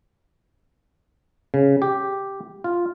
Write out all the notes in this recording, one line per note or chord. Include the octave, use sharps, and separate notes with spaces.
C#3
G4
F4